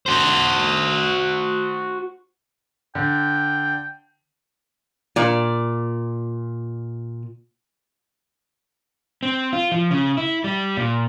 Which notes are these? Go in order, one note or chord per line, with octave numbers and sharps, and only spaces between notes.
F#4 C5
D3 G5
A#2 D5
C4
F4
F3
C#3
E4
G3
A#2